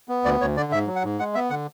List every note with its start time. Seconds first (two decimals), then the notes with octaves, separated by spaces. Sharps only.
0.09 B3
0.25 D2 D5
0.40 D2 C#5
0.57 D3 D5
0.72 G#2 E5
0.87 F#3
0.96 F#5
1.04 G#2
1.19 G#3 F#5
1.35 B3 E5
1.50 D3 F#5